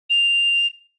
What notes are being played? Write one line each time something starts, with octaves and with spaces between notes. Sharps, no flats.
F7